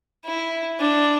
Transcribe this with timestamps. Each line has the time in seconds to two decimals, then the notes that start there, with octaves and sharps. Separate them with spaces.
0.26 E4
0.80 D4